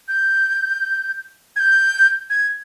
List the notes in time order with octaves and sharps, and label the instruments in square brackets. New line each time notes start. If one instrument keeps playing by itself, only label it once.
[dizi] G6
G#6
G6
G#6